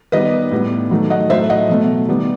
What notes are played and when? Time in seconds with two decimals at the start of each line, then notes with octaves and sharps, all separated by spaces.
0.12 D#3 G3 B3 B4 D#5
0.51 A2 G3 B3
0.91 D#3 F#3 A3
1.10 D#5 F#5
1.30 A2 F#3 A3 C5 E5
1.50 D#5 F#5
1.69 B2 F#3 A3
2.08 D#3 G3 B3